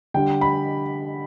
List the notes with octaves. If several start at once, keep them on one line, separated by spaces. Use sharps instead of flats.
D3 G3 G5
B5